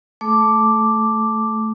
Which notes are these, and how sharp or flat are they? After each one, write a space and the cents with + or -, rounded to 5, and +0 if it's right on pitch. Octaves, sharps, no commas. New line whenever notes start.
A3 +0 A4 -40 D6 +0